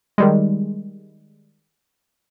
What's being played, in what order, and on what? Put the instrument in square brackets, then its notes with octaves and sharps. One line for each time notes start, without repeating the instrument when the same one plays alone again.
[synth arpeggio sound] D#3 G3 G#3